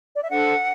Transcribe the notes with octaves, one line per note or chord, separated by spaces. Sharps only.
D5
E5
D4 A4 C5 F#5